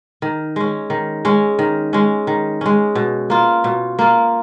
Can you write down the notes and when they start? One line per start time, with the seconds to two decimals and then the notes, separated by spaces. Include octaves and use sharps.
0.22 D#3
0.56 G#3 C#4
0.90 D#3
1.25 G#3 C#4
1.59 D#3
1.93 G#3 C#4
2.27 D#3
2.61 G#3 C#4
2.95 B2
3.30 A#3 F4
3.64 B2
3.99 A#3 F4